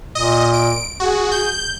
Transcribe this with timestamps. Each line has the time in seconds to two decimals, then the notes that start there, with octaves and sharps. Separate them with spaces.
0.15 A#2 D#5
0.53 D7
1.00 F#4 G#4
1.31 G6